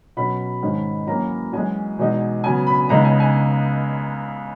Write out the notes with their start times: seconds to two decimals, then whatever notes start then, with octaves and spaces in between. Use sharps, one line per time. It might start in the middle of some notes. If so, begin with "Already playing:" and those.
0.17 B2 F#3 C#4 B5
0.62 G#2 D#3 G#3 C#4
1.07 F#2 E3 A#3 C#4 A#5
1.53 F#2 E3 G#3 G#5
1.99 E2 B2 G#3 D#4
2.44 C#3 F#3 B3 G#5
2.67 B5
2.89 C#2 C#3 G#3 B3 D#4 A#5
3.05 G#5
3.20 G#5